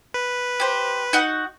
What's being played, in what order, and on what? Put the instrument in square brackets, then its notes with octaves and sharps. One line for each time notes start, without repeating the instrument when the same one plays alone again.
[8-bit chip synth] B4
[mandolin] G4 C5
D#4 F#4 F#5